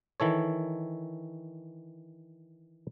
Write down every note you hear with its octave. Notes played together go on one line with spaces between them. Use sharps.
D#3 E3 A4 C#5